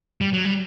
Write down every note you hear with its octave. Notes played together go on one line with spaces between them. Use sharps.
G3
F#3
G3